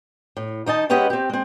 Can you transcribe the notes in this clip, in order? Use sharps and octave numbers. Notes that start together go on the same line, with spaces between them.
A2
D#3 D#4 D#5 A5
G#3 C#4 G4 B4 D#5 F#5
C4 G4
G#3 C4